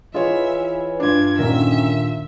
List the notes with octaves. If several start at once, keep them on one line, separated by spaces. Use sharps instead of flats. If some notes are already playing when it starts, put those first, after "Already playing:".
E3 F4 G#4 B4 C#5 D#5 E5
G2 D4 F4 G#6
D#2 A#2 D3 D#3 C#4 A#4 E5